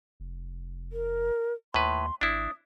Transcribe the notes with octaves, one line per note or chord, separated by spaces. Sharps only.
F1
A#4
D#2 A2 B4 C6
G#1 D4 E4 D#6